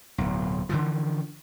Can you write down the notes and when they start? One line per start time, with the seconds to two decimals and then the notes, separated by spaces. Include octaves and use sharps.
0.18 D1 B1
0.69 D3 E3 F3